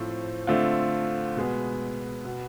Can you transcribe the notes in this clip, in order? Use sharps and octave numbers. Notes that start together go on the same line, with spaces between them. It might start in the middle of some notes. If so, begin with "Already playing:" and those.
Already playing: A2 F3 A3 C4
D3 A3 C4 F4
B2 G#3 B3
B2 B3